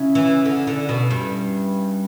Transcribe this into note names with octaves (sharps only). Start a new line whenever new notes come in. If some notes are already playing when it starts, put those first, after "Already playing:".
Already playing: C#3 C#4 E4
E3
D3
D3
B2
G2